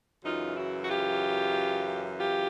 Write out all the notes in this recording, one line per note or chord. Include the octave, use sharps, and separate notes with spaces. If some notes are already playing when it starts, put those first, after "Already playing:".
F#2 C#3 E3 D#4 F4
E4 F#4
F#4
F4 G4
F4 G4